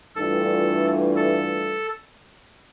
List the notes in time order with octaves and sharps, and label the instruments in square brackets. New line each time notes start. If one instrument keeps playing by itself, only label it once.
[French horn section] G2 E3 A3 D4 F4 [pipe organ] A4
[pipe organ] A4